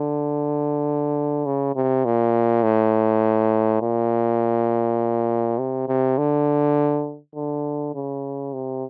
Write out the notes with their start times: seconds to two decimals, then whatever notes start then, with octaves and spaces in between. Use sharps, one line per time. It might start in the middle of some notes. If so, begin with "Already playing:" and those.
Already playing: D3
1.46 C#3
1.76 C3
2.05 A#2
2.64 A2
3.82 A#2
5.59 C3
5.88 C3
6.18 D3
7.36 D3
7.95 C#3
8.54 C3